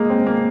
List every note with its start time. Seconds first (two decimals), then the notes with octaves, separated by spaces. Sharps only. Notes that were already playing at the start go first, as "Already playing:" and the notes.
Already playing: G#3 A#3
0.10 C4
0.27 A#3